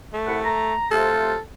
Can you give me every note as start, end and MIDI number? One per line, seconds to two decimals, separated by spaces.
0.13 0.74 57
0.27 0.39 36
0.27 0.39 78
0.27 0.39 83
0.44 0.90 82
0.91 1.33 48
0.91 1.33 57
0.91 1.33 65
0.91 1.39 69